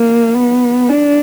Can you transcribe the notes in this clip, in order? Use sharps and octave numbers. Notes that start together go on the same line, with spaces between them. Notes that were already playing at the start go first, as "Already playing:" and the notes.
Already playing: A#3
B3
D4